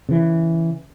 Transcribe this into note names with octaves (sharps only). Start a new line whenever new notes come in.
C#3 E3